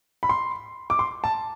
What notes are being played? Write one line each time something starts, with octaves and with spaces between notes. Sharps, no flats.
B5
C6
D6
C6
A5